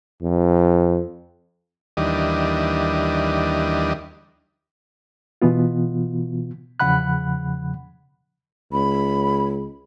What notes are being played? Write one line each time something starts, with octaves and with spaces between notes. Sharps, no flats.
F2
D#2 E3 G3 D4 D#5
B2 E3 B3 F4
E2 C#3 F3 F#5 B5 F#6
C#2 B5